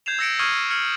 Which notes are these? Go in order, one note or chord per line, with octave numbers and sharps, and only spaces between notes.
G6 G#6 C7 E7 F7
E6 A#6 C#7 D7
C#6 D#6 F6 G#6 C7 D#7
F6 G#6 C#7 F#7